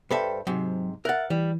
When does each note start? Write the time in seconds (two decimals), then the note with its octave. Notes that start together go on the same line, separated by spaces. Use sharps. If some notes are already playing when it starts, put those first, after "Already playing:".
0.11 G2 A4 B4 C5 E5 G5
0.47 G#2 C3 F#3
1.05 A#4 E5 F#5 F#6 A6
1.30 E3 G3